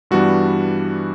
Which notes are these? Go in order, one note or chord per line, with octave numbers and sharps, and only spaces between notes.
G2 E3 G3 B3 D4 F#4